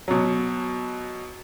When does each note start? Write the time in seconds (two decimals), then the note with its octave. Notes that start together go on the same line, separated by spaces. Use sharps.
0.08 B2 F#3